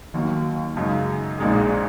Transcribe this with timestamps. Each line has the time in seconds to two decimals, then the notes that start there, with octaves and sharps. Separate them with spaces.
0.14 D#2 D#3 F#3 A#3
0.76 F#2 C#3 G#3 D#4
1.38 A#1 A#2 G#3 D#4 G#4